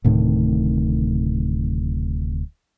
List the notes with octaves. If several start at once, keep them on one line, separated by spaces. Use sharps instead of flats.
D1 A2 C3 D#3